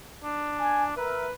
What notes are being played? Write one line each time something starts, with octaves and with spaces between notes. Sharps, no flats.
D4
G#5
A#4 B4 E5